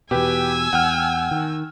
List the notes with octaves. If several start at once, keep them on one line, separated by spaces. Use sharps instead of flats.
E2 B2 G4 B4 G5 G#5 E6
E2 F#5 G5 F6
D#3